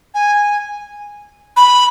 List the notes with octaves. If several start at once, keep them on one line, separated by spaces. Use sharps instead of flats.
G#5
B5